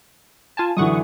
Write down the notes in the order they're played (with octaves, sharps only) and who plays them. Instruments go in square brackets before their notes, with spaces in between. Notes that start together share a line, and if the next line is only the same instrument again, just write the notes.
[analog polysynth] F4 G#5 A5
[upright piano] F#2 D3 E3 [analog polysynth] F#5 C#6 D#6